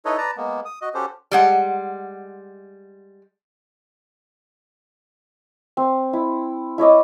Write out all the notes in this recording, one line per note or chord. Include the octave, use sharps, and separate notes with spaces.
D#4 E4 A4 B4 C#5 D#5
B4 D5 A5 A#5
G#3 A#3 B3
D#6
F#4 D#5
C#4 F#4 G4 A4 C5
G3 G#3 F#5
C4 C6
E4
E4 C#5 D#5 D6